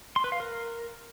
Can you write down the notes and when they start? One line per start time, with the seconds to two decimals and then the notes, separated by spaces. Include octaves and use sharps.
0.16 C6
0.24 B4
0.32 F5
0.40 A#4